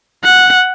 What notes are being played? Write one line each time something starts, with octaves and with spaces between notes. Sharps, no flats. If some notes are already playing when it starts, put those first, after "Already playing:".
F#5